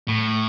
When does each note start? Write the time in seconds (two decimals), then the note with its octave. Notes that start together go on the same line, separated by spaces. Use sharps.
0.08 A2